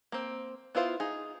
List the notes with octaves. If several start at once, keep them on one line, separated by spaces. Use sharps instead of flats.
A#3 C4
B3 E4 F4 C5
D#4 G#4